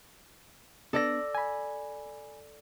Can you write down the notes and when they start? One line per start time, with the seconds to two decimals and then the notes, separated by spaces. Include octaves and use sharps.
0.93 B3 D4 A4 D5 A#6
1.35 G#5 B5